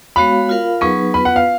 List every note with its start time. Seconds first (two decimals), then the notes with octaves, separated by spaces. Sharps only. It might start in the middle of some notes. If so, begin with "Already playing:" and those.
0.16 G#3 B3 F#4 C#5 F5 B5
0.49 F4 A#4 F5
0.81 F#3 B3 D#4 G#4 B4 C#6
1.14 B3 F4 B4 B5
1.25 F#5
1.36 F5